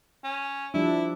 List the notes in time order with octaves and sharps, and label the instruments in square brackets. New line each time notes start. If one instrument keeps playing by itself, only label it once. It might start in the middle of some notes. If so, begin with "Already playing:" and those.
[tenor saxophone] C#4
[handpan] F3 G3 D4 [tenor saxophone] E4